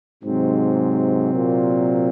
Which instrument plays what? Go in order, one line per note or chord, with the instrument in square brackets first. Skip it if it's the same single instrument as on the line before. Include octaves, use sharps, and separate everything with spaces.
[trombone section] G#2 [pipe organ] C3 F#3 C4
[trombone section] A#2